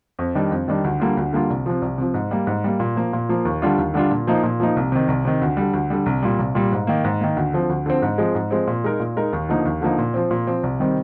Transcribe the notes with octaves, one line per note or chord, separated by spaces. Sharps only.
F2
D#3 G3 D4
F2
D#3 G3 D4
D2
D3 G3 A#3 F4
D2
D3 G3 A#3 F4
C2
C3 F3
C2
C3 F3
G#2
G3 A#3
G#2
G3 A#3
A#2
F3 A#3
A#2
F3 A#3
D#2
D3 G3 D4 F4
D#2
D3 G3 D4 F4
A#2
F3 A#3 D#4
A#2
F3 A#3 D#4
C2
C3 D#3
C2
C3 D#3
D2
D3 G3
D2
D3 G3
C2
A#2 G3
C2
A#2 G3
G#2
D#3 A#3
G#2
D#3 A#3
D2
D3 F3 C4
D2
D3 F3 C4
G#2
F3 G#3 C4
G#2
F3 G#3 C4
A#2
G#3 D#4 A#4
A#2
G#3 D#4 A#4
D#2
D3 F3 A#3 D#4
D#2
D3 F3 A#3 D#4
A#2
F3 C4
A#2
F3 C4
C2
C3 D#3 G3 C4